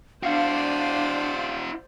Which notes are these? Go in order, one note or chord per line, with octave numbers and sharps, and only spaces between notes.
D4 E4 F#4 C5 D5 F5 C7